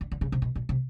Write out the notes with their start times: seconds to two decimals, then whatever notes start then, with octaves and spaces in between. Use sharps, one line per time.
0.01 D3
0.12 D3
0.21 C#3
0.32 C3
0.42 B2
0.56 A#2
0.69 C3